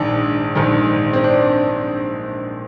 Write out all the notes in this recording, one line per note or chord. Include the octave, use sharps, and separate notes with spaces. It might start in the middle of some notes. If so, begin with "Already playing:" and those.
Already playing: A#1 G#2 D#3 D4
A#1 G#2 D#3
C4
D4